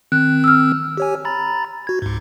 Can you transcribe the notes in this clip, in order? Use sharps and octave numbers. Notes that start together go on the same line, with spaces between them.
D#3 C4 F#6
E6 F6
G4 C#5 G#5
A#5 B5 A6
F#4 G#6
C#2 G#2